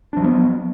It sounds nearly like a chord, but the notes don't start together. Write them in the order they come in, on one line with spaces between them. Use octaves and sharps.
D4 F3 F#3 B3